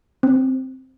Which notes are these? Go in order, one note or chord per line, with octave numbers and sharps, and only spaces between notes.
C4